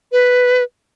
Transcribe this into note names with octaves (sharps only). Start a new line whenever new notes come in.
B4